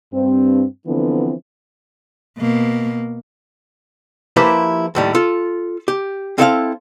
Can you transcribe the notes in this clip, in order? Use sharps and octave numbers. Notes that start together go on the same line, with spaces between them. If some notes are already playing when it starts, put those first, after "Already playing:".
G2 C4
D3 E3 F3 B3 C4
B2 A#3
F3 A#3 E4 G4 B4 C5
D#2 A2 G3
F4 A4
G4
C4 E4 A4 C5 E5 F5